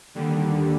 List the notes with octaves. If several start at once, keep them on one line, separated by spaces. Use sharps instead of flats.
D#2 D3 G3